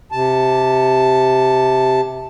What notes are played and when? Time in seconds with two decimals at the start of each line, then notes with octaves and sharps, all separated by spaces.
0.12 C3 A5